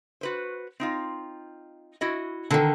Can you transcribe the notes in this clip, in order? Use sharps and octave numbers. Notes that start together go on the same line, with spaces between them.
F#4 B4 C5
C4 D#4 F4
E4 F#4 D#5
D3 D#3 A4 A#4 A#5